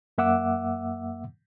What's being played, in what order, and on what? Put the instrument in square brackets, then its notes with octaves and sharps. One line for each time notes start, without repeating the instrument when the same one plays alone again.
[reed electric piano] F#2 A#3 E5 F#5 D6 E6